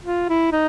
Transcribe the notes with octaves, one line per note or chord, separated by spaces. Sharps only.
F4
E4
D#4